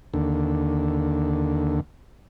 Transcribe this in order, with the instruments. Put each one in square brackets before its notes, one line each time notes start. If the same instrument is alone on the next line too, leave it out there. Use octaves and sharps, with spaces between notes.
[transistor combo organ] D#2 D3